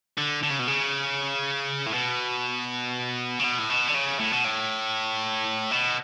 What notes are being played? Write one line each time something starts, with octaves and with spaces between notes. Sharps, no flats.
D3
D3
C#3
B2
C#3
A2
B2
C#3
B2
A2
B2
D3
C#3
A2
B2
A2
B2